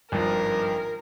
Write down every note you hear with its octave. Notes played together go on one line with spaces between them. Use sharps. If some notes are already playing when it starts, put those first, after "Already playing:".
G#1 G2 F3 A#4